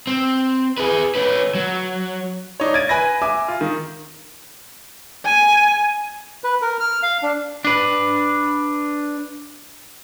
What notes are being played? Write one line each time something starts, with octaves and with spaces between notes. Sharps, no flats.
C4
G#4 B4
C#4 B4
F#3
D4 D#4 C#5
G#6 A6 D7 D#7
B4 G#5 B5 G#6 A#6
E5 G#5 D6
F4
D#3
G#5
B4
A#4
F6
F5
D4
D4 B4